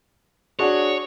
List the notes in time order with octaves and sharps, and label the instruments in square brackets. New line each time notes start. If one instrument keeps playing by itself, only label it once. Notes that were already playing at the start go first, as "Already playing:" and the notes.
[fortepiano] D4 F#4 G#4 [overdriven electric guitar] C#5